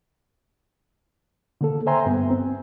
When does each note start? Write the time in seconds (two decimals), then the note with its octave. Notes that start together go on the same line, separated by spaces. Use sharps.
1.61 D3 A#3 A4
1.87 C5 E5 G5 G#5 A#5 C6
2.06 G2 B3
2.30 C4